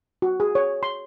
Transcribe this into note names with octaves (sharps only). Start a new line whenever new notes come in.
F#4
G#4
C#5
C6